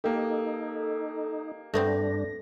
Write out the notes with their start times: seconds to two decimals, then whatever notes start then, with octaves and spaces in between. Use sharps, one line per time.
0.04 A#3 D#4 G4 A4
1.74 G2 A3 B3 C4 D4 A#6